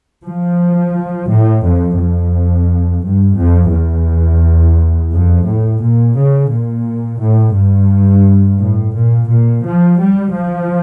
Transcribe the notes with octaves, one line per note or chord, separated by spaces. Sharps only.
F3
A2
F2
F2
G2
F2
E2
F2
A2
A#2
C#3
A#2
A2
G2
A2
A#2
A#2
F3
G3
F3